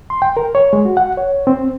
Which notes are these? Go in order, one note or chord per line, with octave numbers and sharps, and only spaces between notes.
C6
G5
A#4
C#5
G#3
F#4
F#5
C#5
C4